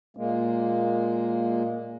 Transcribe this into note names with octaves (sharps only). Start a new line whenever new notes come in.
A#2 G#3 A#3